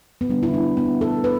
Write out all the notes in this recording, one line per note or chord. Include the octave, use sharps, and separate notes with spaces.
B3
D3 G3 D4
E4
D4
B3
A4
B4